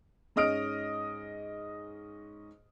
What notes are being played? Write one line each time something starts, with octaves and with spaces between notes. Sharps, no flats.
G#2 C#4 D#5 D#6 F6 D7